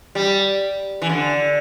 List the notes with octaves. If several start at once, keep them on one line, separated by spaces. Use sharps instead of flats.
G3
E3
D3